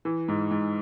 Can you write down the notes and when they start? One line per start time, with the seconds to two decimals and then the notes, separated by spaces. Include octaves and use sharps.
0.05 E3
0.28 G#2
0.51 G#2